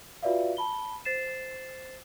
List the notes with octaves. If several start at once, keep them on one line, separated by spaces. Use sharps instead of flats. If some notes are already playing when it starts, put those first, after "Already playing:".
F4 F#4 B4 D5 E5 F5
A5 B5 G7
C5 A6 C7 E7